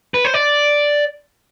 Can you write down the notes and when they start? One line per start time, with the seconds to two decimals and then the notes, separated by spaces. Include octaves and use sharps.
0.14 B4
0.25 C5
0.34 D5